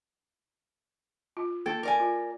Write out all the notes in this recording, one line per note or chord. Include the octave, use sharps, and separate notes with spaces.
F4
A#3 A4 G5
A#4 D5 G#5
F4